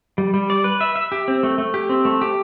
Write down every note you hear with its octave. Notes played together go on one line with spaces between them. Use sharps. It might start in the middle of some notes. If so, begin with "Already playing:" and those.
G3
G3
D5
B4
E5
E5
G4
C4
A3
A3
G4
C4
A3
G4